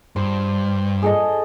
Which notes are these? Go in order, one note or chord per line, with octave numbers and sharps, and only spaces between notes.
G2 C5
G#4 A4 D#5